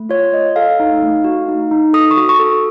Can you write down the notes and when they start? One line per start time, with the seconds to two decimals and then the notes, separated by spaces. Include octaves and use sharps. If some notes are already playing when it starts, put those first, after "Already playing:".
Already playing: A3
0.09 F4 C#5
0.32 A3 D#5
0.56 A4 F5
0.80 D#4
1.02 A3
1.24 F#4
1.48 D#4
1.71 D#4
1.93 A4 D#6
2.11 C#6
2.17 F#4
2.29 C#6
2.39 A4